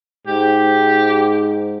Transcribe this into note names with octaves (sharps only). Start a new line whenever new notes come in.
G#2 G4